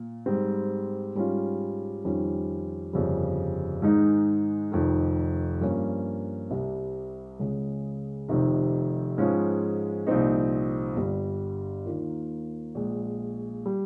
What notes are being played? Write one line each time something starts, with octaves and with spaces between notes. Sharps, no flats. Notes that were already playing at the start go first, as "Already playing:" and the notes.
Already playing: A#2
G#2 G3 C4
G#2 G3 C#4 F4
F2 D#3 G3 C#4 F4
G1 F2 C#3 G3
G#2 D#3 G#3 D#4
F1 F2 D#3
G2 F3 A#3 C#4
C2 C3 G3
C#2 C#3 G#3
F1 F2 C3 D#3
G#2 F3 G#3 C#4 F4
C2 A#2 F3 C4 D#4
G1 G2 G3
D#2 D#3 A#3 F4
A#1 A#2 G#3
G3